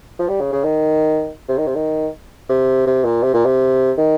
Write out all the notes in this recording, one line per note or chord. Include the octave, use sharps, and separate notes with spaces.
F3
G3
C#3
C#3
D#3
C3
D#3
C3
D#3
C3
C3
A#2
C3
A#2
C3
D#3